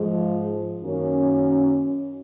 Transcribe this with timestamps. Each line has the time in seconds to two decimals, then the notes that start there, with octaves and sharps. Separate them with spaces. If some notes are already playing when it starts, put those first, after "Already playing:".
Already playing: G#2 F3 G#3
0.80 F#2 D#3 F#3 A#3 C#4